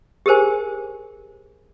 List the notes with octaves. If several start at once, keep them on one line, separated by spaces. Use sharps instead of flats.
G4 G#4 A#4 C5 G#5